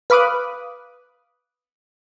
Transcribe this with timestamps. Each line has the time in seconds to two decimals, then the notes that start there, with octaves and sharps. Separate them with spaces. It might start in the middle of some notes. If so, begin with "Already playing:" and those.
0.10 B4 F5 B5 D6 D#6 F#6